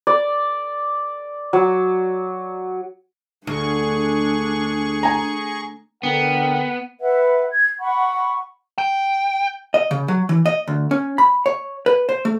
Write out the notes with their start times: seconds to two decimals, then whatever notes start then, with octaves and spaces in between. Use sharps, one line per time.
0.07 D5
1.53 F#3
3.47 D2 D4 G#4 C#6
5.03 G#5 A#5
6.03 D3 B3 A#4 F#5 G5
7.00 B4 E5 F#5
7.51 G#6
7.80 F#5 B5 C#6
8.78 G5
9.74 D#5
9.91 C#3
10.08 F#3
10.29 E3
10.46 D#5
10.68 D2
10.91 C#4
11.18 B5
11.46 C#5
11.86 B4
12.09 C5
12.25 A3